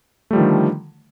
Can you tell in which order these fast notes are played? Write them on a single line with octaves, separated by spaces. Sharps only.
A3 G3 F3 D#3 D3